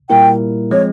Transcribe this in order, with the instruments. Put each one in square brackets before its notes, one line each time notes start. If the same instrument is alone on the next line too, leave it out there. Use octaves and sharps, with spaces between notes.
[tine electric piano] A#2 G3 A#3 E4 A#4 [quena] G5
[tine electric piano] F3 G#3 C4 [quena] C#5